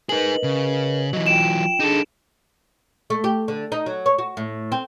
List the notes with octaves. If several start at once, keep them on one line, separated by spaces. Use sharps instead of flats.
D#4 G#4 A#4 B4 D#5 F#7
C#3
E3 F#3 D#5
F4 G5 D7 E7
D4 D#4 G#4 A4
A3
G4
D3
D#4
F#3
C#5
F#4
A2
C4